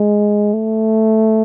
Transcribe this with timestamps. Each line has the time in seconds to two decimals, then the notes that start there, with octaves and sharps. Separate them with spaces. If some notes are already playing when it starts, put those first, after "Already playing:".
Already playing: G#3
0.54 A3